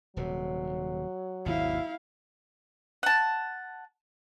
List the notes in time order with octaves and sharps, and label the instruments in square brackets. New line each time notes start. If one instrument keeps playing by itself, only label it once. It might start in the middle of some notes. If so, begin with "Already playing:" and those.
[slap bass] D#1 C3 [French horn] F#3
[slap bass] G#1 D#2 B2 [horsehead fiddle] E4 F5
[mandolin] F#5 A5